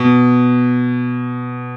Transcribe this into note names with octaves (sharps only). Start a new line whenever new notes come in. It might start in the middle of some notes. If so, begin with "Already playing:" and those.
Already playing: B2